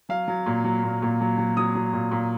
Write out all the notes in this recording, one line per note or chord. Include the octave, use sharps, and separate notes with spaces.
F#3 F5
F#3
A#2
F#3
A#2
A#2
F#3
F#3
F#3 D#6
F#3
A#2
A#2